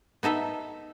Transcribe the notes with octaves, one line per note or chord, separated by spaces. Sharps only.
B3 D#4 A4 E5